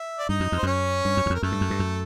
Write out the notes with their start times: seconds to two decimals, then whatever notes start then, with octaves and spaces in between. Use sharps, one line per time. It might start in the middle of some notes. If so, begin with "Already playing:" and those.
Already playing: E5
0.19 D5
0.29 G2 D#4 D#5
0.40 F#2
0.52 F2
0.58 C5
0.63 F#2 C#4 C#5
1.05 G2
1.17 F#2
1.26 E2
1.30 F2 A#4
1.43 F#2 A3 A4
1.52 G2
1.61 F#2
1.70 G2
1.79 F#2